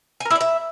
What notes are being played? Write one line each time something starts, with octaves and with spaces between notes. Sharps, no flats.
G#5
A#4
E4
D5
E5